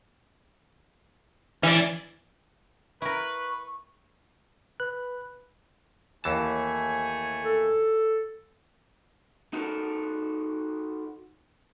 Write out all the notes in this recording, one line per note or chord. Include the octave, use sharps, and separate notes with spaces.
E3 C#4 D5
E4 A#4 B4 C#6
B4 F#6
D#2 E3 A3 G#5 A5
A4
D#4 F#4 A4 A#4